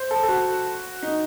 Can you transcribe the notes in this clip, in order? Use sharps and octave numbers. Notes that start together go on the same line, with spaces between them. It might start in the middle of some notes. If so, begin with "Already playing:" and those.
Already playing: C5
A4
A4
F#4
D#4